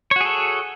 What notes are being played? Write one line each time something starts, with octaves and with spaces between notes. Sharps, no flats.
F#4 G#4 A4 C#5